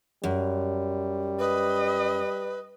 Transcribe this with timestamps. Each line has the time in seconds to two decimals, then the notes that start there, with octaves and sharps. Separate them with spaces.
0.24 F#2 G3
1.39 B4 D#5